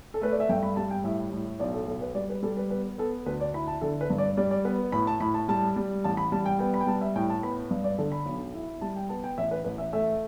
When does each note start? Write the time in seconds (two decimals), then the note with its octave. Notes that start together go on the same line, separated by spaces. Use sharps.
0.14 A4
0.21 A3 B4
0.32 D5
0.40 E5
0.49 G2 G5
0.63 B5
0.76 G3 A5
0.91 G5
1.04 A2 E5
1.33 A2
1.59 B1 D5
1.74 A4
1.88 B1 A4
2.01 B4
2.15 G3 D5
2.30 B4
2.43 G3 A4
2.57 B4
2.70 B3 B4
2.98 B3 A4
3.26 D2 B4
3.41 D5
3.54 E4 B5
3.68 A5
3.81 D3 A4
4.01 B4
4.10 G2
4.18 D5
4.37 G3 D5
4.51 D5
4.65 B3 B4
4.92 A2 B5
5.07 A5
5.20 A2 B5
5.34 A5
5.48 G3 A5
5.76 G3
6.04 A1 A5
6.17 B5
6.32 G3 A5
6.46 G5
6.59 B3 G5
6.74 B5
6.81 G5
6.87 G3 A5
7.01 E5
7.16 A2 G5
7.30 A5
7.43 B3 B5
7.71 G2
7.84 D5
7.98 D3 A4
8.12 B5
8.26 B1
8.54 E4
8.81 G3 A5
8.96 G5
9.09 B3 A5
9.24 G5
9.38 A1 E5
9.51 B4
9.64 A1 B4
9.78 E5
9.93 A3 E5